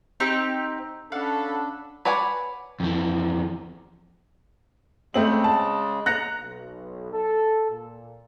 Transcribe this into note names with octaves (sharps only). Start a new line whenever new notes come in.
C4 D#4 G4
C#4 D4 A4 F5 F#5 B5
B4 C#5 D5 F#5 G#5
F2 E3
C#3 G#3 A3 C4 F#7
A5
A#5 F#6 A#6 C#7
B1
A4
A#2